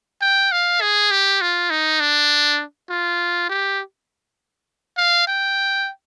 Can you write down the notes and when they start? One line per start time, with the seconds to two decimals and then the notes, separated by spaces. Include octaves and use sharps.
0.22 G5
0.52 F5
0.81 G#4
1.11 G4
1.41 F4
1.71 D#4
2.01 D4
2.90 F4
3.49 G4
4.98 F5
5.27 G5